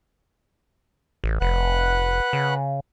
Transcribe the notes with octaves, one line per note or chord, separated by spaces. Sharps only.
A1
F1 B4 F#5 F#6
C#3